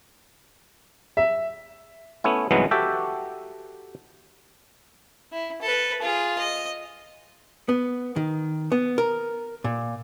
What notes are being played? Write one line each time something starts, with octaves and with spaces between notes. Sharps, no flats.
E5
A3 B3 C#4 E4
C2 G#2 E3 F#3 G#3 B3
F#4 G4 A4 E5 G5
E4
A4 B4
F4 G#4
D#5
B3
D#3
B3
A#4
A#2